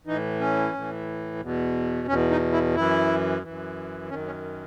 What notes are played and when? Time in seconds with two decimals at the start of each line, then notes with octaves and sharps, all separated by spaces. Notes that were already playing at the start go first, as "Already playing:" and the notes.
0.06 A2 E3 D#4
0.40 C#4
0.74 A2 E3
1.41 E2 B2
2.08 E2 B2 C#4
2.31 D#4
2.52 E4
2.75 F#2 E3 E4
3.43 F#2 E3
4.09 D#3 C#4
4.13 F#2
4.26 C#4